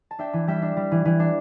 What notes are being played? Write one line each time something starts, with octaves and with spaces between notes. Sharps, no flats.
A5
D4 E5 G5
E3
G3 E5 G5
D4
G3
E3
E3
D4